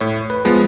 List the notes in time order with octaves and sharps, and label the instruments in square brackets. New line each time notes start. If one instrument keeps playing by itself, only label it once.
[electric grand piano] A2 [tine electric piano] C#5
[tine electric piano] B4
[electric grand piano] F3 G#3 B3